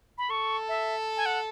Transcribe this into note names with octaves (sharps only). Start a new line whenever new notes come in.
B5
A4 C#6
E5
G#5
F#5